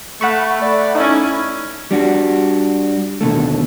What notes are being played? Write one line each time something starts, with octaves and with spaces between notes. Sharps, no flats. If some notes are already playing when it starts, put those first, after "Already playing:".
A3 F#5 B5 C#6
A3 D5
C#4 D#4 E4
G3 D4 F#4
D#2 B2 D3 A3